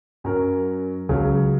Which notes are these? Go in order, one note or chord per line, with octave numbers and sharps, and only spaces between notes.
F#2 F#3 C#4 A#4
C#2 C#3 F#3 C#4